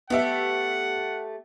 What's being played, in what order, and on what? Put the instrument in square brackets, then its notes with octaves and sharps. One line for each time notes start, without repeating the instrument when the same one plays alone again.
[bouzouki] A3 G4 [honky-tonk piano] B3 E5 [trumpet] F#5